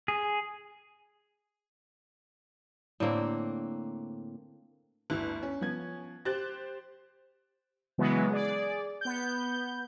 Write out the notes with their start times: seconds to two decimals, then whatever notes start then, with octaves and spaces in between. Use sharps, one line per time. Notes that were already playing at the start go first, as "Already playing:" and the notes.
0.08 G#4
3.00 A2 D3 A#3 C4
5.10 G1 D2 E4 F#6
5.43 C#4
5.61 F3 B3 G#6
6.25 G4 C5 F#6 A6
7.98 C#3 E3 F#3 G#3 B3
8.30 G#4 D5
9.01 B3 G6